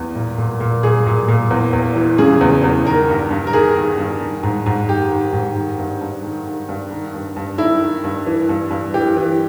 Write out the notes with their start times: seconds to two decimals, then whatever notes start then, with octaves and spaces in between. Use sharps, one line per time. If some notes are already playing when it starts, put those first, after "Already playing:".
Already playing: E2
0.15 A#2
0.38 A#2
0.60 A#2
0.83 A#2 G#4
1.06 A#2
1.28 A#2
1.50 E2
1.73 E2
1.96 E3
2.18 C#3 G#4
2.41 E2
2.64 E2
2.85 D#3 A#4
3.09 G2
3.31 G2
3.47 A#4
3.53 D#3 G#4
3.76 D#3
3.98 G2
4.21 D#3
4.43 G#2
4.66 G#2
4.88 D#3 G4
5.11 D#3
5.33 G#2
5.56 D#3
5.79 G2
6.01 G2
6.24 D#3
6.46 D#3
6.69 G2
6.91 D#3
7.14 G2
7.36 G2
7.58 D#3 E4
7.82 D#3
8.04 G2
8.27 E3
8.49 G2
8.71 G2
8.94 E3 G4
9.16 E3